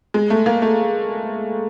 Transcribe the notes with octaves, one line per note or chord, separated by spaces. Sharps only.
G#3
A3
A#3
A3